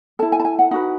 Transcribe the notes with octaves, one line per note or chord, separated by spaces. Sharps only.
E4 A4 A5
G#5
A5
G#5
F#5
D#4 F#4 B4 F#5